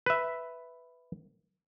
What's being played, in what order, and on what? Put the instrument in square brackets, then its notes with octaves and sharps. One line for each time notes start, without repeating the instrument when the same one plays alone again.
[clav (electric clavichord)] B4 E5